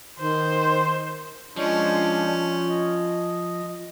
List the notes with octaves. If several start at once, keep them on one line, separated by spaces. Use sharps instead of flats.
D#3 C5
F3 G#3 C#4 D4
D#5